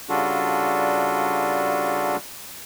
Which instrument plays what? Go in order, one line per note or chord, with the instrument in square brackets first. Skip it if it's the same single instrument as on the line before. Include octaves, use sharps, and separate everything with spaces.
[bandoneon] C#3 G3 D4 F4 F#4 A4